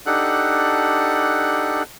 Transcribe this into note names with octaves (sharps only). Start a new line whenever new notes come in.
D4 D#4 G4 A4 F#5 F#6